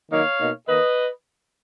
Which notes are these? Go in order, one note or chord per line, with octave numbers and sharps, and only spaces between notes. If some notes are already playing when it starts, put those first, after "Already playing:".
D#3 F#3 A#3 D#4 C#5 F5
B2 A#3 D#4
D#3 A#3 D#4 B4 D#5